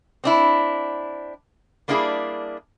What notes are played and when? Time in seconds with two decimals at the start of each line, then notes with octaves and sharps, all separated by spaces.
0.24 C4 D4 E4
1.88 G3 A#3 D4 E4 F#4 G#4